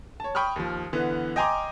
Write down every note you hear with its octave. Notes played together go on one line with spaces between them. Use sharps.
C#5 A5
G5 B5 C#6 D#6 F6
D#2 F3
D3 E3 B3
D#5 G5 G#5 A#5 C6 D6